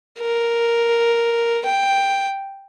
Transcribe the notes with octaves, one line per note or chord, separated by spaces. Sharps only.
A#4
G5